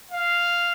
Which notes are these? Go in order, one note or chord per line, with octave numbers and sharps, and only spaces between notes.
F5